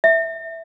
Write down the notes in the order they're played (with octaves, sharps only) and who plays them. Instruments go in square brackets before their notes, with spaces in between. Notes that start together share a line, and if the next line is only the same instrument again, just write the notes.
[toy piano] E5